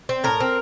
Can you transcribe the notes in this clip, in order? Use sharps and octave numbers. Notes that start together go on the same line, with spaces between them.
C4
A2 A#4
C4